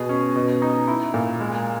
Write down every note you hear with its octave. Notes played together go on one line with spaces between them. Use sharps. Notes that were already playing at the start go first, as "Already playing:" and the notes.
Already playing: B2 G#4
C#4
B2
D#4
E4
A#2
G#3